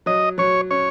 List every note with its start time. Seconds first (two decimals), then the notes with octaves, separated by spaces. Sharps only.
0.06 F#3 D#5
0.38 F#3 C#5
0.71 C#4 C#5